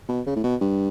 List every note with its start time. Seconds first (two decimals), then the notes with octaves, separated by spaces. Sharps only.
0.09 B2
0.26 C#3
0.36 A2
0.44 B2
0.61 G2